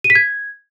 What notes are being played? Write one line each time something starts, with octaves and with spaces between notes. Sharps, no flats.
D#7
B6
G#6